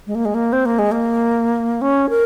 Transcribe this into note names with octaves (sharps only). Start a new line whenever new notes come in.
G#3
A#3
G#3
A#3
C4
A#3
G#3
A#3
C#4
A#4